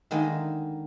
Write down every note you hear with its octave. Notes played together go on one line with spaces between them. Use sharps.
D3 D#3 G#3 A#3 D#4 A#4